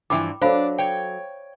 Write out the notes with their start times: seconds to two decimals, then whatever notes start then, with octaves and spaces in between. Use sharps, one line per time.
0.10 G2 E3 F3 D4 E4 G5 B5 D6
0.42 F#3 D4 A4 C5 D5 F5 B5
0.78 C#5 G5